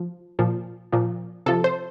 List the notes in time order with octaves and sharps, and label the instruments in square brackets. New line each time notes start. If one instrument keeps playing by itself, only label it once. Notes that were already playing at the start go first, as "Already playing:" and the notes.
Already playing: [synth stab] F3
A#2 F3
A#2 F3
C3 F3 A4
C5